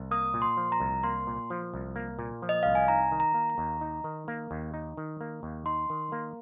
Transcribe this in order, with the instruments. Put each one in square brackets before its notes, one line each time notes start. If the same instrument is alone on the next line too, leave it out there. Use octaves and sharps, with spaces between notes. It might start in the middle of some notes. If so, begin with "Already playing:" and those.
Already playing: [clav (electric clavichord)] C2
[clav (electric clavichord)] A#3 [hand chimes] D#6
[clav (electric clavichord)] A#2
[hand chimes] C6
[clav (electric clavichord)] F3
[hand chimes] A#5
[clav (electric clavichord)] C2
[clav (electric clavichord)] A#3 [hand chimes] C6
[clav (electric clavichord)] A#2
F3
C2
A#3
A#2
F3
[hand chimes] D#5
[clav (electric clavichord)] C2 [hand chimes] F5
[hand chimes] G#5
[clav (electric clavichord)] D#4 [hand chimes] A#5
[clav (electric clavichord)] D#3
[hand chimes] A#5
[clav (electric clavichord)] A#3
[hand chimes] A#5
[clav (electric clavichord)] D#2
D#4
D#3
A#3
D#2
D#4
D#3
A#3
D#2
[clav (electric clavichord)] D#4 [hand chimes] C6
[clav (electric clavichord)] D#3
A#3